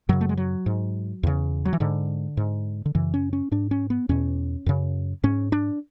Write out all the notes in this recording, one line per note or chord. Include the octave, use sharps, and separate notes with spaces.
F#2 C#3 F#3
A3
G#3
F#3
G#2
E2 C#3
F#3
E3
G#2 D3
G#2
D3
F#2 C#3 E3
C#4
C#4
G#2 D4
C#4
B3
E2 B2 C#4
F#2 C#3
G#2 C#4
D4